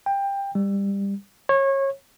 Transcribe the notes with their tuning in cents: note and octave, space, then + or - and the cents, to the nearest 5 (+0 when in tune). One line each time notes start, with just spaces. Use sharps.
G5 +20
G3 +20
C#5 -25